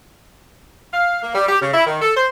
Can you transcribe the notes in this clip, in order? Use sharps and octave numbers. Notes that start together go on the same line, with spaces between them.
F5
A#3
G3
G4
C#3
E4
D#3
A4
C5